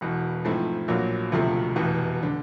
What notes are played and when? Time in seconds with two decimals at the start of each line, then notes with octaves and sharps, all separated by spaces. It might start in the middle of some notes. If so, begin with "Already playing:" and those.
0.01 E1 E2 B2
0.45 G#2 F3 A3 C4 E4
0.88 A#1 A#2 F#3 A#3
1.32 E1 D2 C3 F3 A3
1.76 F1 E2 B2
2.23 D3